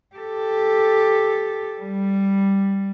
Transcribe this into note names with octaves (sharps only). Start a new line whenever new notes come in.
G4 A4
G3